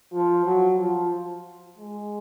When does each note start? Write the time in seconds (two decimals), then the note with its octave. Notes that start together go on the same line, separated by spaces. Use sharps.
0.13 F3
0.46 F#3
0.79 F3
1.78 G#3